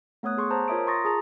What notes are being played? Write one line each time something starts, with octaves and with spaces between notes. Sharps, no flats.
A3 B3 C#5 D#6 F#6
G#4 C6 C#6
C5 A5 A#5
F4 A#4 C#5 E5 D#6 D7
A#5 C6 C#6 D#6 A6 A#6
F4 G#4 A5 A#5